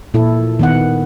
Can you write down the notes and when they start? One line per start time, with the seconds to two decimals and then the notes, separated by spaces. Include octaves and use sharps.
0.14 A#2 E4 A4
0.59 D#3 B3 F#5